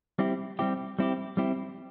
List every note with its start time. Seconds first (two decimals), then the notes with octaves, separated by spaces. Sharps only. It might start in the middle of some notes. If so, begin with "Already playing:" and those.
0.19 G3 C4 E4 G4
0.59 G3 C4 E4 G4
0.99 G3 C4 E4 G4
1.37 G3 C4 E4 G4